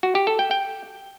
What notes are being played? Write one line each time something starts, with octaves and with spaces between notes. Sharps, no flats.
F#4
G4
A4
G5
G5